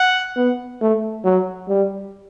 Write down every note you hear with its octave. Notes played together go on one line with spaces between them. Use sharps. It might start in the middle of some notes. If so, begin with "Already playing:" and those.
Already playing: F#5
B3
A3
F#3
G3